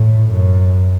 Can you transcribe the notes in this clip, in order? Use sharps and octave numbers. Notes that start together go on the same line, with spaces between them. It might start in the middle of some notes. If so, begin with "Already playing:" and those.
Already playing: A2
F#2